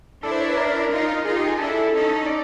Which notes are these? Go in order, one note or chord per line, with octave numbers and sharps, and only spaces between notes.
D4 E4 A4
C5
C#5
B4
A#4
D#4 F4
D#4 F4 G#4
G4
G#4
D4 E4 A4
C#4 D#4
D5